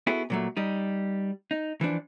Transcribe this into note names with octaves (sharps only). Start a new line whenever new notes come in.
B3 E4 F#4 G#4 A4 B4
A#2 F#3 A3
G3 D#4
D#4
E3 F3 D4